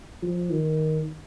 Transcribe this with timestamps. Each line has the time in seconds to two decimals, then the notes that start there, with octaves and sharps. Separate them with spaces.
0.22 F3
0.50 D#3